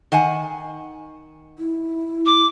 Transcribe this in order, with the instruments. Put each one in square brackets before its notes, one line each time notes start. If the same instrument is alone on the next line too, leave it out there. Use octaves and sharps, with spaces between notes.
[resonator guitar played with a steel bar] D#3 F#5 G#5
[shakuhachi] E4
[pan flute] D6